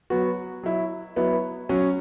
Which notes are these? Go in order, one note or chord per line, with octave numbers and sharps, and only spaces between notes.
F#3 B3 F#4
F#3 E4
F#3 B3 E4
F#3 C#4 F#4